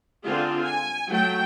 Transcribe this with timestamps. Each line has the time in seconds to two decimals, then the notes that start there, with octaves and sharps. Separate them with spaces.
0.24 D3 C4 F4 G#4
0.63 G#5
1.09 F#3 A3 G5